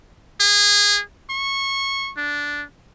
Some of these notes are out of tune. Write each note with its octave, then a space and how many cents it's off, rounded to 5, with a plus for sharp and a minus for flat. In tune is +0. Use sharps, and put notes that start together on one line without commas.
G#4 -20
C#6 -20
D4 -10